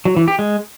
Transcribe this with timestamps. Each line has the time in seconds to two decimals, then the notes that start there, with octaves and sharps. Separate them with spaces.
0.05 F#3
0.17 E3
0.28 G4
0.39 G#3